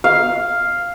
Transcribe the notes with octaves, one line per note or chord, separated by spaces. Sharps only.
F5